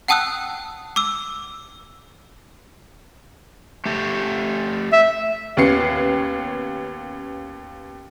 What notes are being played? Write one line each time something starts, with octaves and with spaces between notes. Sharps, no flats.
F#5 G5 A5 D#6 E6 F#6
D6 E6
A3 G4 A4
E5
D#2 B3 C#4 C7 C#7